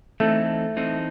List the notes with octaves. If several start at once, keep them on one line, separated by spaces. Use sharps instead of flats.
E3 A3 C4 D#4 A4
E3 C4 D#4 A4